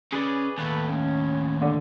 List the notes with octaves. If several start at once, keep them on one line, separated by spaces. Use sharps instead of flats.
C#3 G#4 B4 D5
D#2 A2 A3 A4 B4
C#4
D3